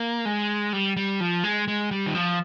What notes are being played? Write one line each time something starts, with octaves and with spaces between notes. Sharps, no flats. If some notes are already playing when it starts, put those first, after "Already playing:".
Already playing: A#3
G#3
G3
G3
F3
G#3
G#3
G3
D#3
F3